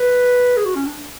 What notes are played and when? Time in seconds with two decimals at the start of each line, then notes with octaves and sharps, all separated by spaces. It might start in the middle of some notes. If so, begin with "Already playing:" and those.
Already playing: B4
0.57 G#4
0.66 F#4
0.75 C#4
0.86 D4